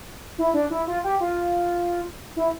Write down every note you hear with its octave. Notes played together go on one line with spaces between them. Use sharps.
E4
D4
E4
F4
G4
F4
E4